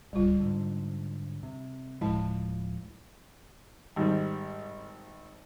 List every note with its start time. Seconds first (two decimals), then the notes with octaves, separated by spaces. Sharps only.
0.13 D1 C#2 G3 F4
0.40 G#2 D3
1.43 C3
2.01 D1 A2 F3 G#3 E4 A5
3.96 G#1 G#2 G3